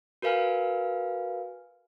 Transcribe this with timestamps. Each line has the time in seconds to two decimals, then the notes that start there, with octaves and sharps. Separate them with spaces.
0.22 F#4 A#4 B4 F5 G#5 F6